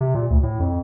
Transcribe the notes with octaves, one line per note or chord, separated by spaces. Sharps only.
C3
A#2
D2
A2
F2